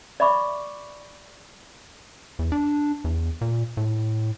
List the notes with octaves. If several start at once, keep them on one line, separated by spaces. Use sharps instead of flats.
D5 E5 B5 C#6 D6
E2
D4
E2
A#2
A2